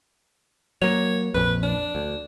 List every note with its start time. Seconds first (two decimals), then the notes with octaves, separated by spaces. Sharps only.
0.82 F#3 A#3 C#5
1.35 A#1 F2 B4
1.63 D4
1.95 D2